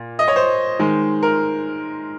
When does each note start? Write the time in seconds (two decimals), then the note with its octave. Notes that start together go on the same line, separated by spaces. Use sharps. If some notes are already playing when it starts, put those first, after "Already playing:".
Already playing: A#2
0.19 D#5
0.28 C#5
0.36 C5
0.79 D#3 G#3
1.23 A#4